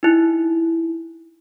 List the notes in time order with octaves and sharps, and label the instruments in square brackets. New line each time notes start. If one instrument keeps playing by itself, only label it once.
[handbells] D#4 E4